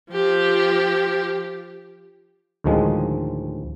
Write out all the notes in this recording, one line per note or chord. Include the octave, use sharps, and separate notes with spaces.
F3 G4
D2 A2 D#3 F3 G#3